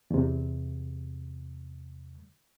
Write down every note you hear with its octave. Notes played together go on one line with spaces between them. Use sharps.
E2 C3